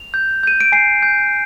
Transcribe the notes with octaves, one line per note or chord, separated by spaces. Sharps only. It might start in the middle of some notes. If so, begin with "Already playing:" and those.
Already playing: F7
G6
G6 D#7
D7
G#5 C7
G6